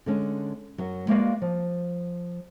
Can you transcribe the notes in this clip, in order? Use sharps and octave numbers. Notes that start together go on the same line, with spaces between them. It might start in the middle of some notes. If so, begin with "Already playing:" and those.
D3 G#3 C#4
F#2 F#3
G#3 A#3 B3 F#4 D5 F5
F3